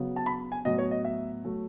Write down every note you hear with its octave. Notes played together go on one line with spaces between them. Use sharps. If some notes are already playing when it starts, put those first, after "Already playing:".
Already playing: C#3 F#3 B3
A5
B5
G#5
A2 F#3 B3 D#5
C#5
D#5
E5
F#3 A3